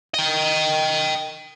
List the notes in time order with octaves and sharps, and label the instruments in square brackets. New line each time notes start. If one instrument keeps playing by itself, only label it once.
[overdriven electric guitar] D#5 G5